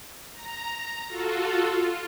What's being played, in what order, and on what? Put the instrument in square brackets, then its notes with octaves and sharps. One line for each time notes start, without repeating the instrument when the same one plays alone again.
[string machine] A#5
F4 F#4 A4
F4